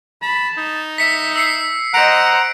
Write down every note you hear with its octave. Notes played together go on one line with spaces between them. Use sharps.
A5 B5
D#4
E5 B6 C#7
E6 C7 C#7
C5 D#5 F#5 A#5 D7